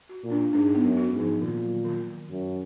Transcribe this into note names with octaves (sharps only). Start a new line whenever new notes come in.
F#4
A#2
D4
G#2 D4
B3
F#2
F#4
G#2
F3
A#2 D#3
F#3
D#3
D#3
F#2 D#3